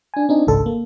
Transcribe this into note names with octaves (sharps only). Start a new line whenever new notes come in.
D4 G#5
C4 D4 D#4
G#1 C#2 A4
A#3